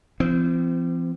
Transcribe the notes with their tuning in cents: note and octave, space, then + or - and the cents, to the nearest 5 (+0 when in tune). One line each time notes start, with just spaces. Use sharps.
F3 -45 C4 -25